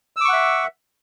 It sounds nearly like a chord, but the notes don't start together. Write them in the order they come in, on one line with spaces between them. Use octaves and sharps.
E6 D6 C#6 F#5 E5